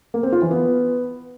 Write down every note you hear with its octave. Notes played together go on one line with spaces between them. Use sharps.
A#3
C4
F4
E3
B3